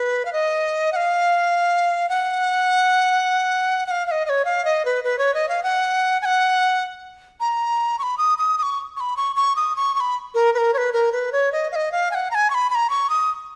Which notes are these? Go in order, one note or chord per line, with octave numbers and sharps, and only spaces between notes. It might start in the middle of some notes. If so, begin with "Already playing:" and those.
Already playing: B4
F5
D#5
F#5
F5
F#5
F#5
F5
F5
D#5
D#5
C#5
F5
D#5
B4
B4
C#5
D#5
F5
F#5
G#5
F#5
A#5
C#6
B5
D#6
D#6
D#6
C#6
C#6
B5
C#6
C#6
D#6
C#6
C#6
B5
A#4
B4
A#4
C#5
B4
A#4
B4
C#5
D#5
F5
D#5
F5
G#5
F#5
A#5
G#5
C#6
B5
B5
A#5
C#6
D#6